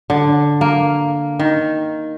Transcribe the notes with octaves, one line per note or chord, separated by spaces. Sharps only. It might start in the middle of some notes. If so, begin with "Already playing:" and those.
D3
A#3
D#3